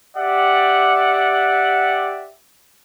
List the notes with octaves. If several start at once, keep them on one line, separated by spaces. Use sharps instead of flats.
G4 D5 E5 F#5